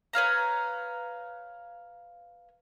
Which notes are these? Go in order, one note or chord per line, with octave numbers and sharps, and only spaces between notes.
B4 C#5 F5 A#5